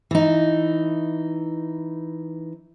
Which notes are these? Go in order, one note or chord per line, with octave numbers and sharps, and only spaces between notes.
E3 D#4